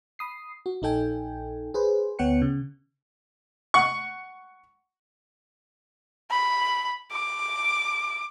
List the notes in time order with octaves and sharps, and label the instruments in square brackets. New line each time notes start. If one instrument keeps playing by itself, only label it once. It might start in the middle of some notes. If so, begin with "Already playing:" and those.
[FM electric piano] B5 D#6 C7
F#4
A#1 D#4 A4 G5 G#5
G#4 B4 C5
D2 B3 C#5 F#5 G5 C#7
C#3
[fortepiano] F#5 C#6
[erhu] B5
D6